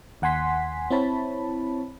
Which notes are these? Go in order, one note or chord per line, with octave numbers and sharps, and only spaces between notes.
D#2 F#5 G#5 C6 B6
C4 E4 C#5 A5 B5